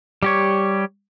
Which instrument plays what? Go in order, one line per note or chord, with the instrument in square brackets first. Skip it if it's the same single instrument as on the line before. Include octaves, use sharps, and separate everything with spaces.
[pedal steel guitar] G3 G4 C#5